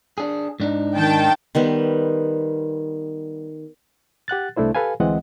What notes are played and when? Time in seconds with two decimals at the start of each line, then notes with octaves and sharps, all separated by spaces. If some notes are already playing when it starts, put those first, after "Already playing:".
0.18 D4 G#4
0.60 G#2 D4 D#4
0.95 D#3 G5 A5
1.55 D#3 G3 B3 C5
4.28 G4 F#5 F#6 A6
4.56 C2 A3 D4 E4 C5
4.75 G4 A4 B4 F5 G#5
5.00 D2 E3 G#3 C4 D#5 F#5